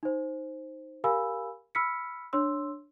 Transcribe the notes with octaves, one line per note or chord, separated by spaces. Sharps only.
D#4 C5
G4 A#4 F5 G#5 B5 E6
B5 E6 F6 B6 C#7
D4 C#5 C6 E6